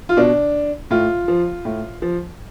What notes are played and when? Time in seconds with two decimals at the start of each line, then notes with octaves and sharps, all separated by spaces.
0.09 F4
0.17 B2 D4
0.91 A2 F4
1.28 F3
1.65 A2
2.02 F3